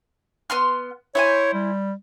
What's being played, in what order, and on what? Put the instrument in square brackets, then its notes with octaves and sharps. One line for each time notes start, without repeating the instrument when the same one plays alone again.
[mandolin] B3 C6 F6
[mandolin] E4 C5 G#5 [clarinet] C#5
[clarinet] G3